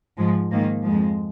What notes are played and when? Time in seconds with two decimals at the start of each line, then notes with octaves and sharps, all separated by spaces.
0.17 G#2 F3 G#3
0.51 G#2 D#3 A#3
0.84 F2 F3 G#3